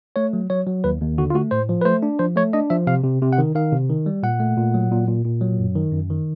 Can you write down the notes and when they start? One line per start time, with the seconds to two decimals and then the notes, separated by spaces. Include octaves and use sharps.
0.16 A3 C#5
0.33 F#3
0.50 F#3 C#5
0.67 F#3
0.84 D#2 B4
1.01 D#2
1.18 D3 F#4
1.30 F4
1.34 A3 F#4
1.51 A2 C5
1.69 F3
1.81 B4
1.85 A3 C5
2.03 D4
2.19 F3 C5
2.36 A3 C#5
2.53 D4 D#5
2.70 F3 E5
2.87 C3 F5
3.04 C3
3.22 C3
3.33 F#5
3.38 D#3
3.55 D#3 F5
3.72 C3
3.90 D#3
4.06 G3
4.23 A#2 F#5
4.40 A3
4.57 A#2
4.74 F#3
4.92 A#2
5.07 A#2
5.25 A#2
5.41 F#3
5.59 F#2
5.76 D#3
5.93 F#2
6.10 D#3